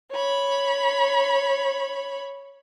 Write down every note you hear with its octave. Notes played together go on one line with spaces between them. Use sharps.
C#5 B5